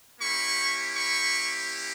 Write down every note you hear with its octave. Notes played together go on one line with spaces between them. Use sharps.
A#3 C#4 E4 G4 B5 C#6
B5 C#6